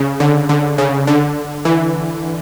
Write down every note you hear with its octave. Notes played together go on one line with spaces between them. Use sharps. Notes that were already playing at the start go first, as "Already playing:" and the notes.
Already playing: C#3
D3
D3
C#3
D3
E3